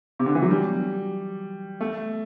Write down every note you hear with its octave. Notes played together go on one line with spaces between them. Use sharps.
C3
D3
E3
F#3
G3
A3